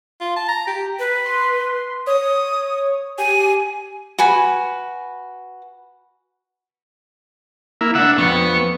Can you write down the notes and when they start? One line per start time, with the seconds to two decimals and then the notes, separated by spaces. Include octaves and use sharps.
0.21 F4
0.36 A5
0.48 A#5
0.67 G4
0.99 B4
1.25 C6
2.07 C#5 D#6
3.18 G4 G#5
4.19 F#4 B4 G#5 B5
7.81 A#3 E4
7.95 C#2 D4 E5 F#5
8.18 F2 B3 C#6